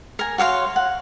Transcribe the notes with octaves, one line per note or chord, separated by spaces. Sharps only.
A#4 G#5
F#4 C#5 F5 C6
F#5